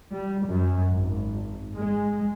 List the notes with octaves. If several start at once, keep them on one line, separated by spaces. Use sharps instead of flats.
G3
F#2
G#1
G#3